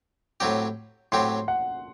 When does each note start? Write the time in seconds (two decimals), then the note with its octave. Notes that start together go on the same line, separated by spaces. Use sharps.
0.40 A2 F#3 C4 G4
1.12 A2 F#3 C4 G4 C6
1.48 F#5